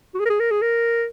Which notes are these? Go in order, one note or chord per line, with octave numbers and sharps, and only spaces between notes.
F#4
G#4
A#4
G#4
A#4
G#4
A#4